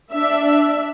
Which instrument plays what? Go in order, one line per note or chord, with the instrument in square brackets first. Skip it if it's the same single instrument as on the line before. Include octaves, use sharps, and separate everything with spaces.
[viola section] D4 E5